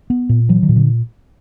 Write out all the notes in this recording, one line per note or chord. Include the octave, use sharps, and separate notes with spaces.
B3
A#2
E3 F#3
D#3
A#2
D3